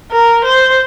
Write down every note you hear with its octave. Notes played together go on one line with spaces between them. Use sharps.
A#4
C5